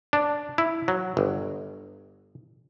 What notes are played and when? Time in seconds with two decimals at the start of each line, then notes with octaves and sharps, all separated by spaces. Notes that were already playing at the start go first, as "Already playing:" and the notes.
0.13 D4
0.58 E4
0.88 F#3
1.17 G1